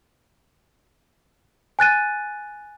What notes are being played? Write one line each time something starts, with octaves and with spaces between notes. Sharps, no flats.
G#5 F#6 A6 D#7